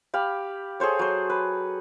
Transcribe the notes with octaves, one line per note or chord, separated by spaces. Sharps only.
G4 F5 B5
G#4 A4 C5 C#5
F#3 C5
B4